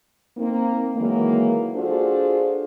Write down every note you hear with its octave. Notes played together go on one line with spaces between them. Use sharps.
A#3 C4 D#4
D#3 E3 F#3 G#3 A#3
D4 F4 F#4 G#4 A4 C5